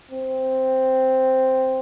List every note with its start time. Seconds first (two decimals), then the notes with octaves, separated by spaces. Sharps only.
0.11 C4